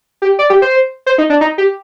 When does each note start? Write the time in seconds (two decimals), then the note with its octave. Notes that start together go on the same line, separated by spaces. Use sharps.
0.22 G4
0.39 D5
0.50 G4
0.62 C5
1.06 C5
1.18 D#4
1.30 D4
1.41 D#4
1.58 G4